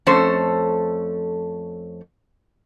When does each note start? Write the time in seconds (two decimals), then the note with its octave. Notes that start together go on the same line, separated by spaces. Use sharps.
0.07 F2 A3 C#4 A4 C5